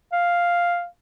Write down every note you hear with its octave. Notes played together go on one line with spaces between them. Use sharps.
F5